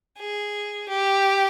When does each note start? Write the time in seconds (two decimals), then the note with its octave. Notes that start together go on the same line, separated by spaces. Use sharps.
0.18 G#4
0.89 G4